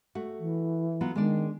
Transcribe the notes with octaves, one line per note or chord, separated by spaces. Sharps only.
A3 F#4
E3
F#3 B3 F4
D#3 G#3 D4 D5